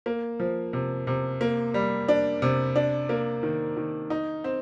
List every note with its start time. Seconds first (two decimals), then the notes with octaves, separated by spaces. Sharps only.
0.06 A#3
0.40 F3
0.73 C3
1.07 C3
1.41 A#3
1.74 G3
2.08 D4
2.42 C3
2.76 D4
3.09 A#3
3.43 D#3
3.77 D#3
4.10 D#4
4.44 C4